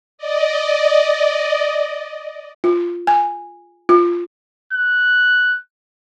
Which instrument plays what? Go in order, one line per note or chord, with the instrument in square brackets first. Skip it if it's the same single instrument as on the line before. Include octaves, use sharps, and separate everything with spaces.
[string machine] D5 D#5
[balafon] F4
G#5
F4
[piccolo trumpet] F#6